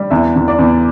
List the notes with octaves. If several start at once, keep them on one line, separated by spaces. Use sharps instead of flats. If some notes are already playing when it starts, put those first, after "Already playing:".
Already playing: G3
E2 E5
E2
D5
E2